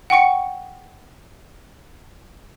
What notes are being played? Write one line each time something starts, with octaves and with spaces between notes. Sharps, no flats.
F#5 G5 C#6 C#7